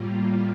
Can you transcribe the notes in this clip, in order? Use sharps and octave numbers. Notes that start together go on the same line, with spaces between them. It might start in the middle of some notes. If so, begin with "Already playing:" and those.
Already playing: A2 G3 A#3 F4